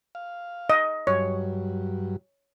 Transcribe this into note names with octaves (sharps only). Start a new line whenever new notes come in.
F5
D#5
G2 F#3 C#5